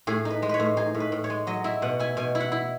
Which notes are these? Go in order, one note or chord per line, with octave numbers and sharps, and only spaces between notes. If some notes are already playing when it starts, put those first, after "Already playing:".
A2 G#4
D#4
B4
G#3
B4 C#5
A2
D#4 G#4
A2
B4
A2
C#5
G#3
F#3 D#5
E4 E5
B2 F#5
E4 G#5
B2 G#5
E4
F#5
E4